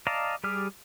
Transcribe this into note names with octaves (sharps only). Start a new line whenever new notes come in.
D5 D#5 F5 A5 A#5
G3 G4 G#4 D5 F6